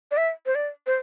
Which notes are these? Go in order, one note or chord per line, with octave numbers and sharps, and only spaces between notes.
D5
E5
C5
D5
C5